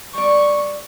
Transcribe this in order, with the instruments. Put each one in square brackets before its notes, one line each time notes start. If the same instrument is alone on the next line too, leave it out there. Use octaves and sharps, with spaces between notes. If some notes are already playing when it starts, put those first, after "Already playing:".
[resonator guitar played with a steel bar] G3 D5 [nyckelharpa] C#6